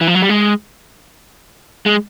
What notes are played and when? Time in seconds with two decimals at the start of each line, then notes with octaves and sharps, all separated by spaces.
0.01 E3
0.07 F3
0.15 F#3
0.22 G3
0.29 G#3
1.86 G#3